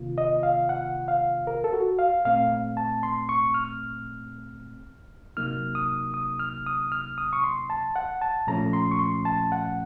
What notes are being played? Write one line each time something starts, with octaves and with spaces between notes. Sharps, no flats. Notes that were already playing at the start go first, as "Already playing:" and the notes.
Already playing: C3 D#3 A#3 F4
D#5
F5
F#5
F5
A#4
A4
F#4
F5
A#2 A3 C4 F5
A5
C6
C#6
F6
C3 F#3 A#3 D#4 F6
D#6
D#6
F6
D#6
F6
D#6
C#6
C6
A5
F#5
A5
A#2 F3 A3 C#4 A#5
C6
C#6
C6
A5
F#5